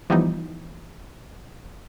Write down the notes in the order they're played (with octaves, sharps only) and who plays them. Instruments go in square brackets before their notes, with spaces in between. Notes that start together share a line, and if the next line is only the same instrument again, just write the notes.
[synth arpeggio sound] E3 F3 G3 B3 D#4